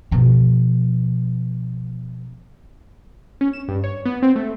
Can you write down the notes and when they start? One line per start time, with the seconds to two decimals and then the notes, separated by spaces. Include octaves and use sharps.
0.11 B2 F3
3.41 C#4
3.53 E7
3.68 G2
3.84 C#5
4.05 B3
4.22 C4
4.36 A3